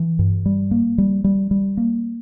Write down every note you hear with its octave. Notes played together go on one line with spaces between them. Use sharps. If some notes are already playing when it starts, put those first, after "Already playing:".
Already playing: E3
G2
G3
A#3
G3
G3
G3
A#3